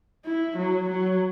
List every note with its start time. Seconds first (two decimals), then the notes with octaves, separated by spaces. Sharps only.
0.24 E4
0.57 F#3
0.89 F#3